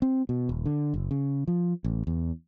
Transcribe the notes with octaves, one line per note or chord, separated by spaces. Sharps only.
C4
B2
D#1
D3
F#1
C#3
F3
A1
E2